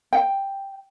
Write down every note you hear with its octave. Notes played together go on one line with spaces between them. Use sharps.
G5